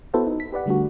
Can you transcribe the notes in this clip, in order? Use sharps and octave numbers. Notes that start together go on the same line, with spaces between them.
B3 E4 F#4 A4 B4 C5
D#4
B6
G4 B4 D5 F#5
D3 G3 A3 D4 F#4